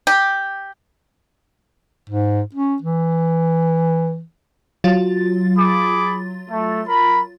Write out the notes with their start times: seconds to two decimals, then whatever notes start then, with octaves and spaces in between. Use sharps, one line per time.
0.07 G4
2.10 G#2
2.55 C#4
2.82 E3
4.84 F#3 F4 A6
5.57 G#4 B5 D6
6.50 A3
6.87 A#4 B5